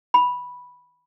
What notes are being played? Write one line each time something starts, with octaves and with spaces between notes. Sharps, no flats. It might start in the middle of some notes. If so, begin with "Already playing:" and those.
B5